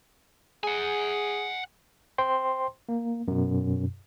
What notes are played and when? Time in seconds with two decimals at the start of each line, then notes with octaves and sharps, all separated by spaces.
0.63 G#4 F#5 G#5
2.18 C5 G5 C6
2.89 A#3
3.28 F#2 B2